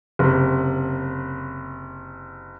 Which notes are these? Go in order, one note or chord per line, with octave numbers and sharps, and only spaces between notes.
F#1 C3